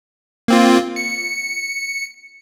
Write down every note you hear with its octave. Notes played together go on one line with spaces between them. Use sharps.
A#3 C4 F4
C#7